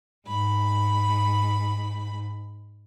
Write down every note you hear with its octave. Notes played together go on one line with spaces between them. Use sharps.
G#2 B5